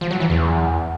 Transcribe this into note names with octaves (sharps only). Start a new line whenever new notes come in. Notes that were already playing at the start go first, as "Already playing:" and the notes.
F3
F#3
E3
E2